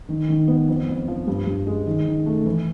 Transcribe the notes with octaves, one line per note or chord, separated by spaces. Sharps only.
D#3
D#3
B3
F2
F2
F3
G2
G2
G#3
D#3
D#3
A3
E3